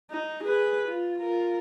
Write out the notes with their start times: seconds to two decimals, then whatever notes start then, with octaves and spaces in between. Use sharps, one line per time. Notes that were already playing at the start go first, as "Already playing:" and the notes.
0.11 D#4
0.44 G#4 B4
0.88 F4
1.19 F4 A#4